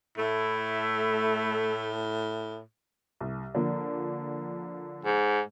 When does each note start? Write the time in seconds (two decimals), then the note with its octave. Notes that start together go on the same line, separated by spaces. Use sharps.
0.18 A2 A3 E4
3.21 C2
3.55 D3 F3 A#3
5.05 G#2